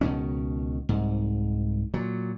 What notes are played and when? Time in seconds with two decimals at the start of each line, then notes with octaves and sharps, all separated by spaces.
0.01 C#2 B2 D#3 C#4
0.89 C2 G#2
1.94 A#2 F#3